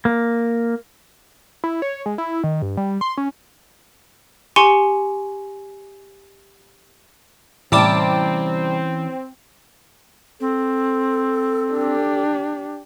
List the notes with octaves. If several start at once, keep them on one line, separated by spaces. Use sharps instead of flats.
A#3
E4
C#5
G#3
E4
D#3
G2
G3
C6
C#4
G4 G#5 C6 C#6 C#7
A2 C3 E3 G3 C4 C#4 A5 D6
C4 A4
D4 G4